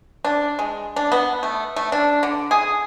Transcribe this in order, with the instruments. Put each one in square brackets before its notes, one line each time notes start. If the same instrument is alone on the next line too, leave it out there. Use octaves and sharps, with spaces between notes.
[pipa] D4
G#3
D4
B3
A3
A3
D4
D3
G#4